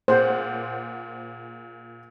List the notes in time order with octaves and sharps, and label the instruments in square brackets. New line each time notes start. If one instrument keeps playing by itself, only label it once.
[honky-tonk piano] A#2 G#4 F#5 [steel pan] C5